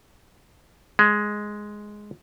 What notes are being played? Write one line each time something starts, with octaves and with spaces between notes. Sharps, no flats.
G#3